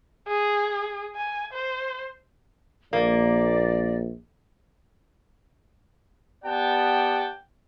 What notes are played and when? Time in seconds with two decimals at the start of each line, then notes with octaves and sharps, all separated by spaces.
0.28 G#4
1.16 G#5
1.53 C5
2.93 A#1 A#3 D5
6.45 B3 G4 D5 F#5 G5 A5